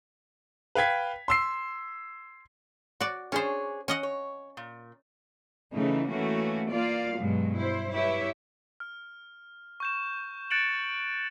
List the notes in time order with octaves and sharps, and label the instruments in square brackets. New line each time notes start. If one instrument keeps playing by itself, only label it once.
[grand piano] B4 F5 G5 G#6 B6
C6 E6 C7
[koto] F#4 D5
[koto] C#4 C5 [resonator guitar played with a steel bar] D4 G#4 C#5
[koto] C#4 D#5 F#5
[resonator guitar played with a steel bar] C#5
A#2
[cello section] C#3 E3 A3 D#4 E4
E3 A3 A#3 C#4 F#4
A#3 F4 D5 F5
G2 B2 F#3 G#3
E4 C5
E4 G4 B4 C#5 E5
[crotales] F6
C#6 G6 E7
F#6 A6 C#7 D7 E7 F#7